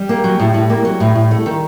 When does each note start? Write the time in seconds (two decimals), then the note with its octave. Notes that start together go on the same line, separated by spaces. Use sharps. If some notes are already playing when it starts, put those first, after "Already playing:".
Already playing: G3 G4
0.09 A#3
0.24 F#3
0.40 A2
0.54 A2
0.70 A#3
0.85 F#3
1.00 A2
1.15 A2
1.31 A3
1.46 D#3